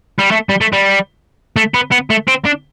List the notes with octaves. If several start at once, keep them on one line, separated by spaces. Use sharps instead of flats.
G3
A3
G3
A3
G3
A3
B3
B3
A3
C4
D4